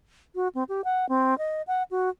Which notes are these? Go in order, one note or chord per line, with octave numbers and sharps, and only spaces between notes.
F#4
C4
G4
F#5
C4
D#5
F#5
F#4